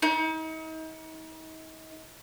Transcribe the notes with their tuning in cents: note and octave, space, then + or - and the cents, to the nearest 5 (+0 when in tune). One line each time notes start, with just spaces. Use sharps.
D#4 +40